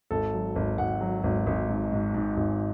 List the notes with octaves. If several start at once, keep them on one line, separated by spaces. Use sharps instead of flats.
G#1 A4
F#3
G#1
G#1 F#5
F#3
G#1
G#1
G#2
G#2
G#2
G#1